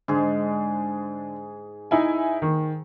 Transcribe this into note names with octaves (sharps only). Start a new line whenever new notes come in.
G#2 D3 G#4
D#4 E4 G#5
D#3